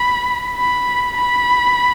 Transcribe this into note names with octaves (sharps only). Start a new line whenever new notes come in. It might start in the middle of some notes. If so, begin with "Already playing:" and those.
Already playing: B5
B5
B5